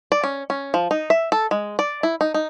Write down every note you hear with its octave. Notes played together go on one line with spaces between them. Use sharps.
D5
C#4
C#4
F3
D#4
E5
A4
G#3
D5
E4
D#4
D#4